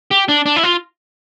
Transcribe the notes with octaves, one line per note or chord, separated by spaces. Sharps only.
G4
D4
D4
E4
F4